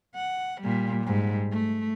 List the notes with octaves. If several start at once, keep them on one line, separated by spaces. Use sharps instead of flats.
F#5
A#2 G3
G#2 G3
A3